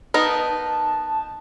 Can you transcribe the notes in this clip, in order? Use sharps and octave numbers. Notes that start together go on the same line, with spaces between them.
B3 D#4 A#4 A5